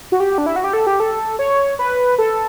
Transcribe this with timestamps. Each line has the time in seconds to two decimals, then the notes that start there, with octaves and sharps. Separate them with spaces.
0.12 F#4
0.20 G4
0.38 D4
0.46 E4
0.56 F#4
0.64 G4
0.73 A4
0.87 G4
1.00 A4
1.39 C#5
1.79 B4
2.18 A4